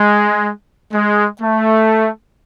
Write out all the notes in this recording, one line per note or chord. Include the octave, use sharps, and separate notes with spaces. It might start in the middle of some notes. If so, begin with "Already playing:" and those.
Already playing: G#3
G#3
A3